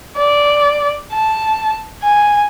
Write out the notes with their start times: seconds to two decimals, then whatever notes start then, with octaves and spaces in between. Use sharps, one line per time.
0.17 D5
1.12 A5
2.03 G#5